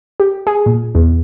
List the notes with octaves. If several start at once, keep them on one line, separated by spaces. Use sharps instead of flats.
G4
G#4
A#2
E2